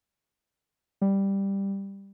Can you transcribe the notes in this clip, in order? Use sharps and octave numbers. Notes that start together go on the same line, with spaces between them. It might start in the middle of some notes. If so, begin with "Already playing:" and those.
G3